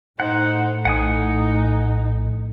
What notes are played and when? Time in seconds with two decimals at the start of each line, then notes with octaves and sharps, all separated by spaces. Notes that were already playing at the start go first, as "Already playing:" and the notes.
0.20 A2 D#4 C5 F#5
0.85 A#1 D#4 F#5 G#5 D#6